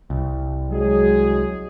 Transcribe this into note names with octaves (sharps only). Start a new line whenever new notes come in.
C2
F#3 G#3 G#4